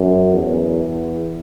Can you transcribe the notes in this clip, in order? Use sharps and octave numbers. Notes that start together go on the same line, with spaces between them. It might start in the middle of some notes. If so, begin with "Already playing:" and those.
Already playing: F#2
E2